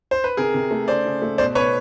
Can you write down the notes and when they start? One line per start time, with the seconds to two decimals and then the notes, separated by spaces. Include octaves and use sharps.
0.11 C5
0.24 B4
0.37 C3 G#4 A#4
0.54 C3
0.71 A3
0.88 C#3 C5 D5
1.06 C#3
1.22 A3
1.38 B2 C5 D5
1.55 B2 B4 C#5